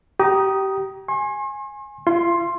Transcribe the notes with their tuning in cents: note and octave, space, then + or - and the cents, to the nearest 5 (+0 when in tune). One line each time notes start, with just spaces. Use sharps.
G4 -20 A#5 +20 D#6 +0
G#5 +0 C6 +45
F4 -40 C6 +10